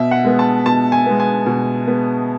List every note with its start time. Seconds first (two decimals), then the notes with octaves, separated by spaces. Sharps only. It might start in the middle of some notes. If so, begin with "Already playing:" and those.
Already playing: B2 E5
0.11 F#5
0.25 G#3 B3
0.39 A5
0.66 B2 A5
0.92 G#5
1.06 G#3 B3
1.20 G#5
1.46 B2
1.87 G#3 B3